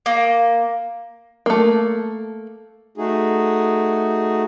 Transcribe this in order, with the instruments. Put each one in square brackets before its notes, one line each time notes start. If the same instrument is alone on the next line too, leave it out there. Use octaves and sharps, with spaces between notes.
[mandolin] A#3
[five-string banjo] A3 A#3
[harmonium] A3 D#4 F#4 G#4